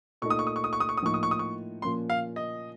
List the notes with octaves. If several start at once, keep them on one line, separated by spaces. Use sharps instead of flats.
A#2 A3 D#4 A4 C#6
D#6
C#6
D#6
C#6
D#6
C#6
D#6
C#6
D#6
A2 F3 A#3 D#4 C#6
D#6
C#6
D#6
C#6
A#2 F3 A#3 C#4 C6
F5
D#5